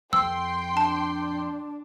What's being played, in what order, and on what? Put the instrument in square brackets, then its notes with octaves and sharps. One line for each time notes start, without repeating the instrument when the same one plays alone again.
[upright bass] F2 [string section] G5 C6 [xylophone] E6
[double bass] D4 [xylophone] A5